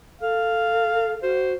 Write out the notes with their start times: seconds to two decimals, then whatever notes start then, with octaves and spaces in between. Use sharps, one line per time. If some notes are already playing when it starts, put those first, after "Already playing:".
0.21 A4 F5
1.22 F#4 C5